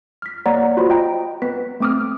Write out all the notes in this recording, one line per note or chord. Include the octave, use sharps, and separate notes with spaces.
F6 B6
A#3 C#5 D5 F#5 A#5
F4 F#4 C5 B5
D#5 G5 A#5
B3 B4 B6
A3 C4 D6 D#6 F6